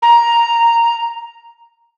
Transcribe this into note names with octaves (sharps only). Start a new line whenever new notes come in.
A#5